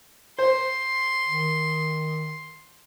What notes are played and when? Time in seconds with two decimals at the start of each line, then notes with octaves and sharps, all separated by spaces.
0.39 C5 C6
1.25 D#3